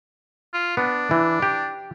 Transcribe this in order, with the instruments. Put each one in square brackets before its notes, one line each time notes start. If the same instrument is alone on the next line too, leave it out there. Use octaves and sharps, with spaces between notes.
[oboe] F4
[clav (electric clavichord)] B3 [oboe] D4
[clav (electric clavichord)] E3
G4